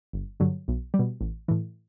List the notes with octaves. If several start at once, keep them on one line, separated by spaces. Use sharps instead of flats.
G1
G2 D3 F#3
B1
G3
B2
A1
A2 E3